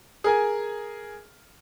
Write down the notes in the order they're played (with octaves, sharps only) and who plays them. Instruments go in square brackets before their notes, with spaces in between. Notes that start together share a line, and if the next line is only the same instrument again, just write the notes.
[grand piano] G#4 A#4 G#5